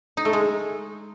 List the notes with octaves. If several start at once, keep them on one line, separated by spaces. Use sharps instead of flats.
D#4
A3
G#3